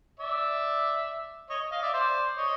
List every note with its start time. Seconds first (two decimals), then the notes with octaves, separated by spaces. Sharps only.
0.20 D5 E5
1.50 C#5 D#5
1.71 D#5 F5
1.82 D5 E5
1.93 C5 D5
2.37 C#5 D#5